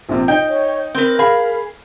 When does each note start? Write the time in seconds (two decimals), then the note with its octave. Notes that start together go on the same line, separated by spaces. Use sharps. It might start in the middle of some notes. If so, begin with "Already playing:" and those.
0.09 A#1 C3
0.28 D#4 G5
0.48 C#5
0.95 C4 A#4 B4
1.19 G#4 F5 B5